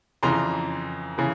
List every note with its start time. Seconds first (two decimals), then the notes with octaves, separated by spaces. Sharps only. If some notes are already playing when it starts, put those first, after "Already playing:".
0.23 F2 C#3 E3 A#5 C6
1.18 C#3 E3